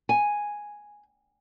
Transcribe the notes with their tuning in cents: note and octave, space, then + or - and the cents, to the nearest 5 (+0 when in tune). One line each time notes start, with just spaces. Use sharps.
G#5 +0